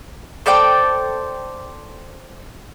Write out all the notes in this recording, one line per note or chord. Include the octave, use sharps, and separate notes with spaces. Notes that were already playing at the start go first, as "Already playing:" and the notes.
A4 C5 D5 G5